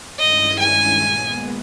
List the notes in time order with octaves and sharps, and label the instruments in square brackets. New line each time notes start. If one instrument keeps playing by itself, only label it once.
[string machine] G2 D#3 G#3 C#4 E4 [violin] D#5
[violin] G#5
[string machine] A#2 G#3 B3